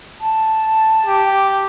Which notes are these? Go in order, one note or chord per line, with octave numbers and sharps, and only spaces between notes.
A5
G4